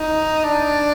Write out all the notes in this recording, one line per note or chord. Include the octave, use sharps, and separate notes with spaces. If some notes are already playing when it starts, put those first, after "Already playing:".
Already playing: D#4
D4